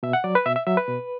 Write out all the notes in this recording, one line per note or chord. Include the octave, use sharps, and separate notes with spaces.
B2 E5
F#5
F#3 D5
B4
B2 E5
E5
F#3 E5
B4
B2